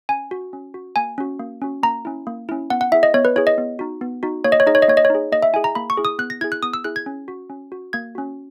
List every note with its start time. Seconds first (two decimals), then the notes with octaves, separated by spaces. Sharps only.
0.09 C#4 G#5
0.31 F#4
0.53 C#4
0.74 F#4
0.96 A#3 G#5
1.18 C#4 F#4
1.40 A#3
1.62 C#4 F#4
1.83 A#3 A#5
2.05 C#4 E4
2.27 A#3
2.49 C#4 E4
2.70 B3 F#5
2.81 F#5
2.92 E4 G#4 E5
3.03 D#5
3.14 B3 C#5
3.25 B4
3.36 E4 G#4 C#5
3.47 D#5
3.58 B3
3.79 D#4 F#4
4.01 B3
4.23 D#4 F#4
4.44 A#3 C#5
4.52 D#5
4.60 C#5
4.67 D#4 G#4 D#5
4.75 C#5
4.82 D#5
4.88 A#3 C#5
4.97 D#5
5.05 C#5
5.10 D#4 G#4
5.32 A#3 D#5
5.42 E5
5.54 E4 G#4 G#5
5.64 A#5
5.75 A#3 B5
5.90 C#6
5.97 E4 G#4
6.05 D#6
6.19 B3 F#6
6.30 A#6
6.41 E4 G#4 G#6
6.52 F#6
6.63 B3 D#6
6.74 E6
6.84 E4 G#4 F#6
6.96 G#6
7.06 C#4
7.28 F#4
7.50 C#4
7.72 F#4
7.93 A#3 G#6
8.15 C#4 F#4